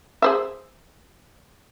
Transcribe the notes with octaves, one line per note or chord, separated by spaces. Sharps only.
G#4 C5 E5